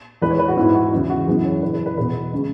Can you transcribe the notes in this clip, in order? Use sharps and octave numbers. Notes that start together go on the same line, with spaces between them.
E2 E3 G#3 B4
C#5
B4
F#4
G#2 E3 B3 E4
F#4
E2 C#3 G#3 B3 E4
F#4
F#2 E3 B3 G#4
C#5
F#2 C#3 E3 B4
B4
B4
E2 B2 B3 B4
C#3 G#3